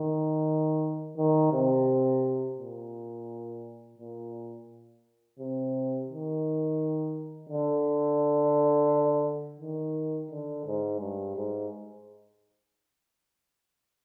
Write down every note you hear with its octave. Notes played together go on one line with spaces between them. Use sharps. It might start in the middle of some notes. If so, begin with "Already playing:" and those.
Already playing: D#3
D#3
C3
A#2
A#2
C3
D#3
D3
D#3
D3
G#2
G2
G#2